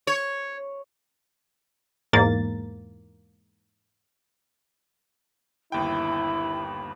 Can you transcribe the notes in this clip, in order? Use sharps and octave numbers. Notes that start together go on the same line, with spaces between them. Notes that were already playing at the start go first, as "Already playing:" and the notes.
C#5
E2 G#2 A#3 A6
G1 D#2 E4 G5 B5